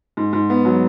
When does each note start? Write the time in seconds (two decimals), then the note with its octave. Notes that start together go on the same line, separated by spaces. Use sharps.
0.17 G#2
0.33 G#2
0.50 B3
0.65 F#3